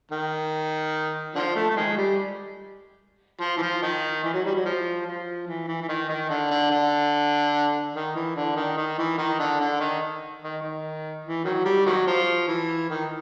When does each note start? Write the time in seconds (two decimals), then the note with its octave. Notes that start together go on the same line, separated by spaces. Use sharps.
0.12 D#3
1.35 D3 F3
1.56 A3
1.70 A3
1.76 D#3 F3 G#3
1.97 G3
3.41 F3
3.57 E3
3.62 F3
3.82 D#3
4.24 E3
4.34 F#3
4.45 G3
4.55 F#3
4.65 F3
5.06 F3
5.47 E3
5.68 E3
5.81 E3
5.89 D#3
6.09 D#3
6.30 D3
6.51 D3
6.70 D3
7.94 D#3
8.15 E3
8.36 D3
8.56 D#3
8.77 D#3
8.98 E3
9.18 D#3
9.39 D3
9.60 D3
9.80 D#3
10.42 D#3
10.62 D#3
11.25 E3
11.44 D#3 F#3
11.65 G3
11.86 D#3 F#3
12.07 F3
12.48 E3
12.90 D#3